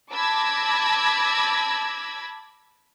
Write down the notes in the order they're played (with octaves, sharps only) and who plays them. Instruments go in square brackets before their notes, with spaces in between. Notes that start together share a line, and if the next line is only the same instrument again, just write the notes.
[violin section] A5 B5 D6 E6 G#6 A#6